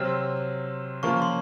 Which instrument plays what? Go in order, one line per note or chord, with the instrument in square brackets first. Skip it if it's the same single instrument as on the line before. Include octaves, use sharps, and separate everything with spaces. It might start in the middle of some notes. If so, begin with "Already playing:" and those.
Already playing: [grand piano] C3 F#3 C4 [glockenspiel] F6
[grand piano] C#3 F3 A#3 C#4 F4 [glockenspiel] C#6
[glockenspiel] C6